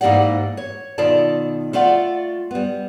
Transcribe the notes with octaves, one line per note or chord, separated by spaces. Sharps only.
G#2 E3 A#3 G4 D5 F#5
C#5
B2 D#3 F4 A4 D5 A5
A3 F4 D5 F#5
G3 B3